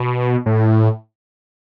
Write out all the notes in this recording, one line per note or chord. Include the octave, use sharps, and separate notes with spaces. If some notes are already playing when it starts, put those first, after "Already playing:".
Already playing: B2
A2